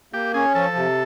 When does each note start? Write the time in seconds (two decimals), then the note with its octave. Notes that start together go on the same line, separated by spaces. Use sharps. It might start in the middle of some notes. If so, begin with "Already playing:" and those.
0.13 A#3 G4
0.34 C#4 G#4
0.55 F3 A4
0.76 C3